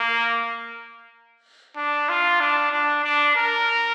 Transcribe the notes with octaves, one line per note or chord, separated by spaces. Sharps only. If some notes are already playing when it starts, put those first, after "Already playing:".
Already playing: A#3
D4
F4
D4
D4
D4
A#4